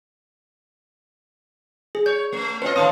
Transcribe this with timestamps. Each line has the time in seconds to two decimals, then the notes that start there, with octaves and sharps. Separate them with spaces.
1.95 G#4
2.06 C#5 G6
2.32 A3
2.62 C4 F4 B4 C#5 D#5
2.76 A2 D3 D#3 C4 F5 A5 D#6